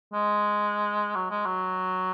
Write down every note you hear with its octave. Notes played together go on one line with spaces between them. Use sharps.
G#3
F#3
G#3
F#3